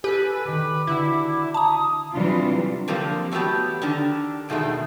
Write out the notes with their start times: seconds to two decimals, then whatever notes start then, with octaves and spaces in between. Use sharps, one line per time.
0.04 G4 A4 B4 G#5
0.45 D#3 G3 D6
0.87 D3 E4 F#4
1.54 A5 A#5 D#6
2.13 C3 E3 F#3 G3 D4 F4
2.88 D3 F3 G3 A#3 C4
3.31 E3 F#3 A3 B3 G4
3.82 D3 D#3 D4 G4
4.49 E2 B2 D#3 G#3 A3